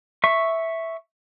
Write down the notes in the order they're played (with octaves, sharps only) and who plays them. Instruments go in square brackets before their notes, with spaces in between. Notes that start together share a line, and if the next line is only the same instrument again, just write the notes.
[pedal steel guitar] E5 C#6